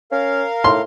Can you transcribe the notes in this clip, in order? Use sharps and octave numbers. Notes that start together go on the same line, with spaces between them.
C#4 A#4 F5
A2 C6